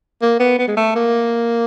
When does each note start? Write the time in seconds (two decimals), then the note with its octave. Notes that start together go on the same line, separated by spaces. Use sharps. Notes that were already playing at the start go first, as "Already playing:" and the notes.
0.22 A#3
0.40 B3
0.59 B3
0.68 G#3
0.77 A3
0.95 A#3